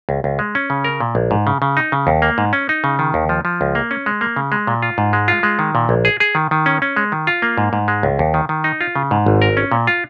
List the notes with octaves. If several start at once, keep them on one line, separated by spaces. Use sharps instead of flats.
C#2
C#2
G#3
C#4
C#3
A#4
A#2
A#1
G#2
C#3
C#3
D#4
C#3
D#2
A#3
G#2
C#4
D#4
C#3
D#3
D#2
F3
F3
C#2
A#3
C#4
G#3
A#3
C#3
G#3
A#2
F4
G#2
G#3
F4
G#3
D#3
A#2
A#1
G#4
G#4
D#3
D#3
C#4
C#4
G#3
D#3
F4
A#3
G#2
G#2
G#3
C#2
D#2
D#3
D#3
D#4
F4
C#3
G#2
G#1
A#4
C#4
A#2
F4